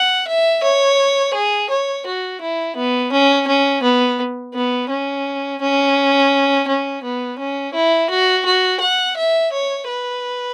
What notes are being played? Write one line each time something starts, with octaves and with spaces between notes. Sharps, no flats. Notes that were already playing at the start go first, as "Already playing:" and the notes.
Already playing: F#5
E5
C#5
G#4
C#5
F#4
E4
B3
C#4
C#4
B3
B3
C#4
C#4
C#4
B3
C#4
E4
F#4
F#4
F#5
E5
C#5
B4